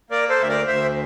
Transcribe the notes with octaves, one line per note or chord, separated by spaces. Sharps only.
A#3 A#4 D5
A4 C5
D2 E5
A#4 D5
D2 C5 E5